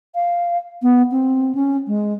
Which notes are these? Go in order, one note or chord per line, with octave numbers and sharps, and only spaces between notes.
F5
B3
C4
C#4
G#3